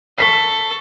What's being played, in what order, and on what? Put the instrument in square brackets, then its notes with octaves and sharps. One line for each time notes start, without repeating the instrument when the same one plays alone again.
[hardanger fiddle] A4 [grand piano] C#6 B6 C7